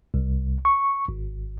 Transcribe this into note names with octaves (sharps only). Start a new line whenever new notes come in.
C2
C#6
G#1